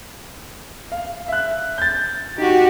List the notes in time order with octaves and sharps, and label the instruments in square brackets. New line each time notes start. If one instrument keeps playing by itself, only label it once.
[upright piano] F5
E5 F#6
G6 A6
[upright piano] D#4 [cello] F#4 G4